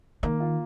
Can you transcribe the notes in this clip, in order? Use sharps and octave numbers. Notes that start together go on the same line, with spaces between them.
D#3 A#3
F4